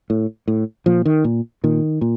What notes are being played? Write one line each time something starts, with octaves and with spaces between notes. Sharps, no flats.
A2
A2
A#2 F3
D#3
A#2
A#2 D#3
A#2